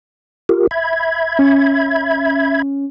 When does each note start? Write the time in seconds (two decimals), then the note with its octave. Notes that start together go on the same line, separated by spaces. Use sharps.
0.49 F4 G4 A#4
0.71 E5 B5 G#6
1.39 C#4